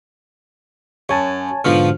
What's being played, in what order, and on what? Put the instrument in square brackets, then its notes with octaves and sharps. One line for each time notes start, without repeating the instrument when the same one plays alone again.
[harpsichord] F#2 [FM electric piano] C#5 G#5 A5
[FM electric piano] G#2 D3 F6 [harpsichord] B2 F3 B3